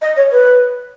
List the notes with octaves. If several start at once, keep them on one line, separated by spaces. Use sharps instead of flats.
D#5
C#5
B4